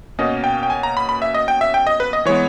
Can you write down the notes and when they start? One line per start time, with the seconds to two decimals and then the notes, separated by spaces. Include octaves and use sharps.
0.18 B2 A#3 C#4 D#5
0.44 G5
0.63 G5
0.70 G#5
0.83 A#5
0.97 B5
1.09 B5
1.22 E5
1.34 D#5
1.48 G5
1.61 E5
1.74 G5
1.87 D#5
2.00 B4
2.13 D#5
2.25 E3 G#3 B3 C#5